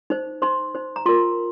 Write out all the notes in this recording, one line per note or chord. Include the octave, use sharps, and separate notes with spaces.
D#4 C5
D#4 C5 C6
D#4 C5
A#5
F4 A#4 C6